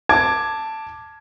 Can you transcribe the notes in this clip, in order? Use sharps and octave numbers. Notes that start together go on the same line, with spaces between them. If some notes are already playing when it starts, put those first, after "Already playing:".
A5 D6 G#6